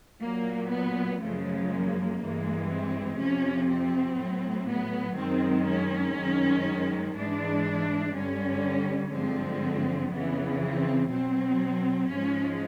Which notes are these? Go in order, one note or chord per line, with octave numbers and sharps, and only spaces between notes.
A#2 F#3 A#3
B3
F#2 C#3 F3 G#3 A3
A#3
G2 E3 G#3
C4
F2 C3 F3 C#4
C4
A2 F#3
B3
F#2 D#3 G#3 C4
C#4
F#2 D#3 G#3
G#2 E3 G#3 D4
G2 D3 G3 C#4
G2 D3 F3 G#3 C4
F2 C#3 E3 B3
C4
B2 F#3 C4
G#2 F3 G#3 C#4